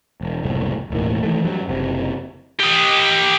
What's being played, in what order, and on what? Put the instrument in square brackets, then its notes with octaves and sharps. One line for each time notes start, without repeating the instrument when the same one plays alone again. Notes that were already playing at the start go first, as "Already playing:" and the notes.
[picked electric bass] E1
F#1 C2 A2
E1 D#2 A2 D#3
D#3 E3 G#3 A3
G2 F#3
F#1 C3
[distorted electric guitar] G4 D#5